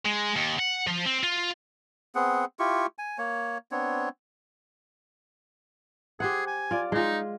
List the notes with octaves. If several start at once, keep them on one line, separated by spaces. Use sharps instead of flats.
G#3
D#2
F#5
F3
C4
F4
B3 C4 G#4 F#5
E4 F4 G4 C#6
G#5
A#3 C#5
B3 C4 D4 C#5
G4 G#4 C5 F#5
G#5
F4 D5
G#3 D#4 F4